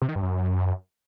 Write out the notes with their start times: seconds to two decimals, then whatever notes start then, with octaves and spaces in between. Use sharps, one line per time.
0.02 C3
0.08 D#3
0.15 G2
0.22 F#2